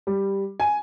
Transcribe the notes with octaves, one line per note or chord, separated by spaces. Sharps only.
G3
G#5